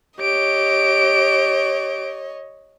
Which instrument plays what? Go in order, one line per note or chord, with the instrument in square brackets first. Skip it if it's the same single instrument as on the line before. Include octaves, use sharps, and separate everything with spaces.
[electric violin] G4 D7 [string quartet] C#5 D#5